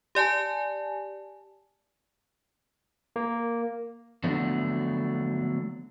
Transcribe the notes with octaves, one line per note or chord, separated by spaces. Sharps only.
G4 D5 G#5 A5
A#3
D3 F3 F#3 A3 B3 D4